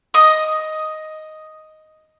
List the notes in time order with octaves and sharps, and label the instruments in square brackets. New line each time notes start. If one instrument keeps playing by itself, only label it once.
[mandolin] D#5 D#6